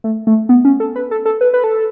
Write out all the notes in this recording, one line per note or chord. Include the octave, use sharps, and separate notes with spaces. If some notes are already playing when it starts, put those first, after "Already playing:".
A3
A3
B3
C#4
A4
B4
A4
A4
B4
B4
A4